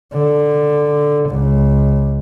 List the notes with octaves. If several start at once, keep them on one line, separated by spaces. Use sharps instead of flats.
D3
C#2